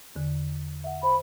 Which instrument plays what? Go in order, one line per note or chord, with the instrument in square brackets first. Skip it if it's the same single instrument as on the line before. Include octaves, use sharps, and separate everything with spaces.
[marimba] E2 D3
E5 F#5
[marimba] C5 [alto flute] B5